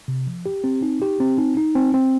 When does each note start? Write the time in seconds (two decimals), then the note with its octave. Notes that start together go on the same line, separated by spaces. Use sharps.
0.08 C3
0.27 F3
0.46 G4
0.64 C4
0.82 D#4
1.02 G4
1.20 C4
1.38 D#4
1.57 D#4
1.75 C4
1.94 C4